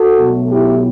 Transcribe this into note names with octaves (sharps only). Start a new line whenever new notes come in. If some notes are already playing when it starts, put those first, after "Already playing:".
Already playing: F#4 A4
B1 B2 F#3 A3
E4 G4